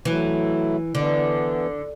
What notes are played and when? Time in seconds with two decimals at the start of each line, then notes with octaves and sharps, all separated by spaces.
0.05 E3 F#3 A3 E4
0.94 D3 E3 B3 D4